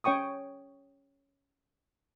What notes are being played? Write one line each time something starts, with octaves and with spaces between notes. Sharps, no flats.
C#4 C#5 G5 C#6 D#6